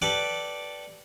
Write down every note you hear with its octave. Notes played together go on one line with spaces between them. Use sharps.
G4 A4 B4 D5